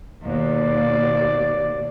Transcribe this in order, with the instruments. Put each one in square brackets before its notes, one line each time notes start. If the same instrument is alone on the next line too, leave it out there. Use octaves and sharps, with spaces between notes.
[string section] D#2 B2 [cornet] D5